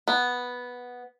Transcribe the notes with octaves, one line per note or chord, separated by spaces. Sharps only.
B3